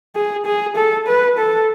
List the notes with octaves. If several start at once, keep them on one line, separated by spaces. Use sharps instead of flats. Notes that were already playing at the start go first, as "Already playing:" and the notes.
G#4
G#4
A4
B4
A4